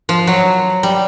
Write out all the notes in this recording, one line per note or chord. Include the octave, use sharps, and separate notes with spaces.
F3
F#3
G3